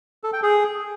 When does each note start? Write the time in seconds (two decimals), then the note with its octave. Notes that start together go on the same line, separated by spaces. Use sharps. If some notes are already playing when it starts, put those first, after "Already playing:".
0.24 A4
0.33 G5
0.43 G#4